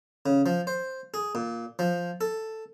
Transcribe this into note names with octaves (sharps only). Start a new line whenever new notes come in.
C#3
F3
C5
G#4
A#2
F3
A4